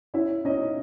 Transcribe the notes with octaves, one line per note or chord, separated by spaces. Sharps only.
C#4 E4 E5
C#4 D#4 D#5